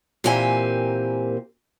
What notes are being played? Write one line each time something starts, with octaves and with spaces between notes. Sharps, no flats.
A#2 E3 A#3 C4 G4 G#5